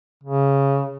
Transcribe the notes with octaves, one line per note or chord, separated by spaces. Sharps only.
C#3